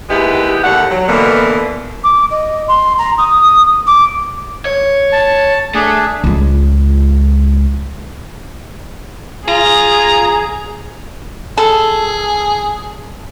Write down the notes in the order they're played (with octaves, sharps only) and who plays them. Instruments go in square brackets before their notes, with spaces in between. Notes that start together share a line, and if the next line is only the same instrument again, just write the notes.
[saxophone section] D#2 G#3 B3 E4 G4
D#2 D3 A3 F#5
F#3
B2 D3 E3 A#3
[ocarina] D6
D#5
C6
A#5
D#6
D6
[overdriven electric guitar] C#5
[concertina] A5
[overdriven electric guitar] A3 [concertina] D4 G#4
[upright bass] C#2 G#3
[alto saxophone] F4 [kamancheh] G#4 [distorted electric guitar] A#5
[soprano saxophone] G#4 [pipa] A4